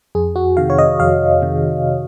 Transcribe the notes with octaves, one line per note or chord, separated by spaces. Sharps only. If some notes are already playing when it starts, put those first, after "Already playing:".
F2 G#4
F#4
C3 D#3 F5
C#5
D#5
F2 F5
C3 D#3